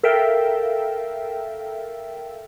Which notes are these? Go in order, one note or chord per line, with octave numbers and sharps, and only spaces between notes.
A4 A#4 E5 F5 G5